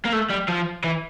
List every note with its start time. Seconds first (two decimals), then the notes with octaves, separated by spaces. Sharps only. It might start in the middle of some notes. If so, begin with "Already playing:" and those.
0.05 A#3
0.13 A3
0.30 G3
0.49 F3
0.84 E3